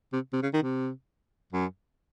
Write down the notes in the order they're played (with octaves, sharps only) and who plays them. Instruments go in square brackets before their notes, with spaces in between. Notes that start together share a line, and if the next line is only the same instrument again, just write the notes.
[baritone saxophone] C3
C3
C#3
D#3
C3
F#2